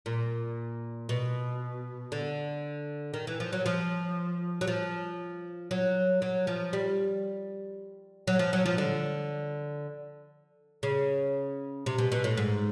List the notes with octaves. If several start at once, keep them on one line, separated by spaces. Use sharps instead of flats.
A#2
B2
D3
D#3
E3
F3
F#3
F3
F#3
F3
F#3
F#3
F3
G3
F#3
F3
F#3
F3
D3
C#3
C3
B2
B2
A2
G#2